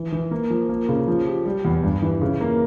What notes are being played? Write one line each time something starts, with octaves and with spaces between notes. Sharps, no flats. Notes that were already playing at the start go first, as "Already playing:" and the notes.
Already playing: E3
E3
A#3
F3
A#3
C#3
F3
G4
G3
E2
G2
E3
C#3
A#3